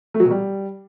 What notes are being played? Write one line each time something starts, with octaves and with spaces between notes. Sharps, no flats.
A3
F#3
B2
G3